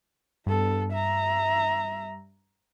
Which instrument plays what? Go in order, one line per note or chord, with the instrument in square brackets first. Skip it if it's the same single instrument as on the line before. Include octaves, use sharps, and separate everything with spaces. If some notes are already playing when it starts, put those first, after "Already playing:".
[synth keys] G2 [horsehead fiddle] B3 A4
[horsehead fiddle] E5 A#5